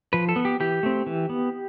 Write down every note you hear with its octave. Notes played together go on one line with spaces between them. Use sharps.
F3 B4
A4
B3
G4
E3 G4
A3 C4
E3
B3